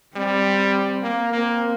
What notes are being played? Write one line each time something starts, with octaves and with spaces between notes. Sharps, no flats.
G3 C4
A#3
A#3 C4